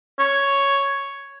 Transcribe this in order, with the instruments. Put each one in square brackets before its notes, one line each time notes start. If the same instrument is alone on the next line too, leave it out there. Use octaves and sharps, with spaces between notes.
[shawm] C#5